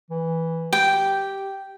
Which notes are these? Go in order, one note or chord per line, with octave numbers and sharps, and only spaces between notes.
E3
G4 G5